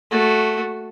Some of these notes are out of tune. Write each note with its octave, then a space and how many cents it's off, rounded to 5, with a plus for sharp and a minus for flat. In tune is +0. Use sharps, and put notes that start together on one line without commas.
A3 -5 F#4 +0